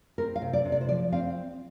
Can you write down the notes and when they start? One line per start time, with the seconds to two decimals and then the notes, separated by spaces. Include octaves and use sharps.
0.18 C4 A#4
0.36 F5
0.42 C3
0.53 D5
0.65 C3
0.72 D5
0.81 C5
0.89 F3 D5
1.12 C4 F5